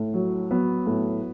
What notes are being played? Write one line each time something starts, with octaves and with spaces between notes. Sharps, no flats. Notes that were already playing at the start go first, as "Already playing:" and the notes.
Already playing: A2
F#3
F#3 B3
A2